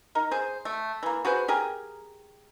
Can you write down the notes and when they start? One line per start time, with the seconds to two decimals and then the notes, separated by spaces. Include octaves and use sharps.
0.15 D#4 A#4
0.31 G#4 C5
0.65 A3
1.03 E3 A#3
1.25 F#4 G#4 B4 C5
1.48 G4 G#4 A#4